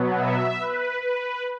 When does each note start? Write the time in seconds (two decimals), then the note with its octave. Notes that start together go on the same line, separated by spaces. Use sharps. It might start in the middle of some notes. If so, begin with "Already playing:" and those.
Already playing: B2 F#3 B3
0.18 E5
0.60 B4
1.01 B4